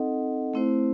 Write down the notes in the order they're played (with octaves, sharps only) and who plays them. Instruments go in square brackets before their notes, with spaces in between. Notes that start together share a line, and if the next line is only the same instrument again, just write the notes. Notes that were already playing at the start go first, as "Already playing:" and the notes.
Already playing: [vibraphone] C4 D#4 A4 D#5 F#5
A3 C4 E4 C5